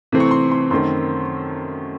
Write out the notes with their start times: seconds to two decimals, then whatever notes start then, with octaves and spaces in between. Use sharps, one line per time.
0.12 C3 E3 A3 C4
0.20 C#6
0.31 C6
0.51 C6
0.71 F#2 D#3 A3 C4 C6